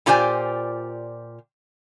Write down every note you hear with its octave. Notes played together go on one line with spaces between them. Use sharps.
A#2 F4 G4 C5 D5 G#5